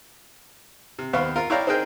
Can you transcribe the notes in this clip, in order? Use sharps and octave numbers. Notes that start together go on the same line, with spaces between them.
C3
D#2 B3 C4 F5 C#6
F4 A#4
E4 C#5 D5 F5 G5 A#5
C4 D#4 G#4 A#4 G5 G#5